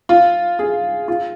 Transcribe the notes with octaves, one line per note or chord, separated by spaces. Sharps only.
F4
G#4
F4